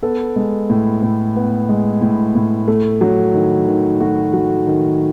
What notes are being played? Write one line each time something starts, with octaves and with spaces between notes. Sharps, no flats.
B3 A4
G#3
A2
A2
B3
G#3
A2
A2
A3
F#3
D#3
D#3
A3 F#4
F#3
D#3